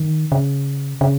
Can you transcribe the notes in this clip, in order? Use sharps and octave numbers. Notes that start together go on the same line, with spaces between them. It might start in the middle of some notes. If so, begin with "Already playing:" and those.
Already playing: D#3
C#3
C#3